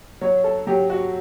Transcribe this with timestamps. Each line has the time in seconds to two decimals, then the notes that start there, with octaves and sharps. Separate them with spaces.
0.21 F#3 C#5
0.44 A4
0.67 F#3 G4
0.90 F#4